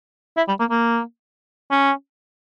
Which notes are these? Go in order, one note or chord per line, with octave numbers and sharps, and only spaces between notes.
E4
G3
A#3
A#3
C#4